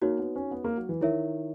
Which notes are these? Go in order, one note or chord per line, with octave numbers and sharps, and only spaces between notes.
A#3 D#4 F#4 C#5
B3
C#4
B3
A#3
F#3
E3
D#3 E4 A#4 C#5 E5